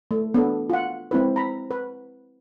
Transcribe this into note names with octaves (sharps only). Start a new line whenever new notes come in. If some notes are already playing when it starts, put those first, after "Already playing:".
A3
B3 D4 A4
F4 F#5
G#3 C4 E4 B4
A#5 B5
B4